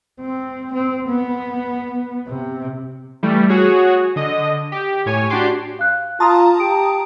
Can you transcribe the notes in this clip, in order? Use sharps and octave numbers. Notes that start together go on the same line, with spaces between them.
C4
C4
B3
C3
E3 G3 A3
F#4 G#4 C#5
D3 D#5
G4
A2 C#5 G#5
D4 F#4 G4 C6 D6
F5 F#6
F4 A5 A#5 C6 D#6
G4 D7